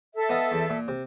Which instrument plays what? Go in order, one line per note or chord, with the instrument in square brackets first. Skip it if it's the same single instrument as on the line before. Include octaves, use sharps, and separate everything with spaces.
[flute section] A4 E5
[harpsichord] B3 D#5 F5
E2
A#2
C3